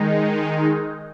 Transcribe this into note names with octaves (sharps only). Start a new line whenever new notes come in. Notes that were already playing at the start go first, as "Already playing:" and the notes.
Already playing: D#3 G#3 D#4